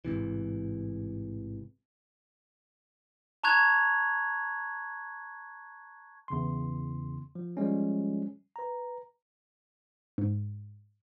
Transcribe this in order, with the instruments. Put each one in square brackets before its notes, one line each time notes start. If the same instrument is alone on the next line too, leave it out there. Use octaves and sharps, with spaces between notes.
[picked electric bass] A1 G#2 C3 E3
[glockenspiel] A5 A#5 C#6 F#6 G#6 F7
[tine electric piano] E2 C#3 C6
F3
F3 G3 G#3 C#4
B4 A#5
[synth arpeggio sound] G#2